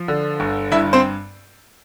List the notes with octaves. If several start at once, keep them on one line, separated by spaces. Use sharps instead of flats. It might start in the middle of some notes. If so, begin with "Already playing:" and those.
Already playing: F3
D3
G1
G2 E4 E5
C4 C5